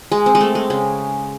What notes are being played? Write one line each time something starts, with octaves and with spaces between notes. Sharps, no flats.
G#3
C4
G#3
A3
G#3
C#3